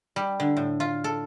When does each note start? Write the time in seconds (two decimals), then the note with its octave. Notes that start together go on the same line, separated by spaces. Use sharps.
0.16 G3
0.40 D3
0.57 A2
0.80 F4
1.04 A4